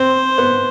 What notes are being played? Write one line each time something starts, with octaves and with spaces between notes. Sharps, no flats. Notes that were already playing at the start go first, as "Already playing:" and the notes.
Already playing: C4 C5
B3